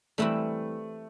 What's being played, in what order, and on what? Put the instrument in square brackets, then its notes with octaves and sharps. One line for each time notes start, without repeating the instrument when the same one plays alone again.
[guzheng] E3 G3 C4 E4 [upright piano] A3